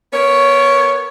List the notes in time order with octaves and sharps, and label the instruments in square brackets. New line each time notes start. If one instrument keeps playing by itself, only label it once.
[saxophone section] B3 A#4 C#5